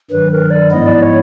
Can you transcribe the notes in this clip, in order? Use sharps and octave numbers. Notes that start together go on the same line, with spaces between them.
G2 D#3 F#3 B4
A#4
D5
G#2 F3 G#3 B3 E4 D#5
D5
C#5